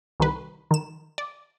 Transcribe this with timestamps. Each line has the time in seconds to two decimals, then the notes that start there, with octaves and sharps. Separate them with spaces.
0.20 C2 D#3 B4
0.71 D#3 E7
1.18 D5